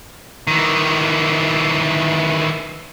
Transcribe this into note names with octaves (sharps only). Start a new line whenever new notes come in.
D#3 E3